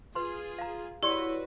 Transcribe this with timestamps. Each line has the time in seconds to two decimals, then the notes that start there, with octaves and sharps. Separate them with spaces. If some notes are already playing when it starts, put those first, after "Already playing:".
0.15 F4 G#4 B4 C6
0.58 F5 A#5
1.03 E4 F#4 G4 B4 C#5 D5 C6